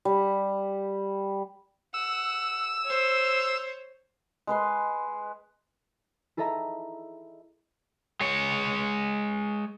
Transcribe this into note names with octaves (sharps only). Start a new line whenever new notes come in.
G3
F#5 E6
C5 C#5
G#3 B4 C6
E4 G#4 A4 D#5 E5 A#5
G#3 C#5